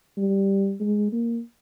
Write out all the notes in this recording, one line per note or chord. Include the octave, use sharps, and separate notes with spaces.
G3
G#3
A#3